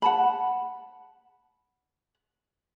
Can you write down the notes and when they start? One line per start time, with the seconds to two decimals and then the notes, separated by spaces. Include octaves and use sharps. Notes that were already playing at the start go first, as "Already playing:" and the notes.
0.02 F#5 A5 B5